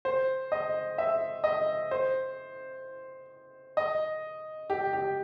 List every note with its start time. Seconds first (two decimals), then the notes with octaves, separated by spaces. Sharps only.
0.05 C5
0.52 D#5
0.98 E5
1.44 D#5
1.91 C5
3.77 D#5
4.70 G4
4.93 G4